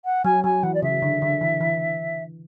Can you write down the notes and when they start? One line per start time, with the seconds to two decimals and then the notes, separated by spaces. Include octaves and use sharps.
0.05 F#5
0.24 F#3 G#5
0.44 F#3 G#5
0.63 E3 F#5
0.74 D5
0.82 C#3 E5
1.02 D3
1.22 D3
1.41 E3
1.60 E3